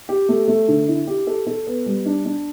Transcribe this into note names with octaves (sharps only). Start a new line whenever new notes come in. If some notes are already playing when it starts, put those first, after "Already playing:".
G4
A3
A3
D3
E4
G4
A4
A4
B3
G3
D4
D4